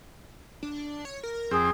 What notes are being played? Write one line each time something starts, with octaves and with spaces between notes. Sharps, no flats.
D4
C#5
A#4
F2 C4 G#4